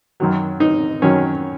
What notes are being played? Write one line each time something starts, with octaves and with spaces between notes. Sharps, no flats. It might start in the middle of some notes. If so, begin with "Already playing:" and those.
F#2 D#3 F#3
D#4
F#2 D#3 F#3 C#4